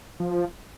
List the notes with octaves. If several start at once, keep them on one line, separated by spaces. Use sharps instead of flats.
F3